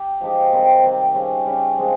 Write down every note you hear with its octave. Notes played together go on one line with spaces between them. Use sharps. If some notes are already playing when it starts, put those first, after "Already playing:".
Already playing: G4
F3 G#3 D#4 G4
C3 D#3 G3 C4
C3 D#3 G3 C4
C#3 G3 C#4
C#3 G3 C#4
F3 G#3 C4